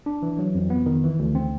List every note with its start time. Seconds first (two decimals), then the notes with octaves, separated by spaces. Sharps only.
0.06 D4
0.22 E3
0.39 F#3
0.55 F2
0.70 B3
0.86 D#3
1.03 E3
1.19 D2
1.35 C4